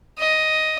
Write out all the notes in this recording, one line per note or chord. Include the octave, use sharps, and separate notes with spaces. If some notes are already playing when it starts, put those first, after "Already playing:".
D#5